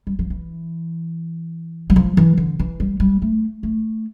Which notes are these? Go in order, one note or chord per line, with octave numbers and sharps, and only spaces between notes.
G3
F3
E3
G3
F3
E3
D3
E3
G3
G3
A3
A3